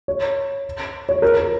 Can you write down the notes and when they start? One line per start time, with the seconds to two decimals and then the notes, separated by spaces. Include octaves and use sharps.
0.08 C#5
1.09 C#5
1.22 A#4
1.37 A#4